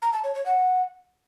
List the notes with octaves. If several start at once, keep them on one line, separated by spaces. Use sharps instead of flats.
A#5
A5
C#5
C#5
F#5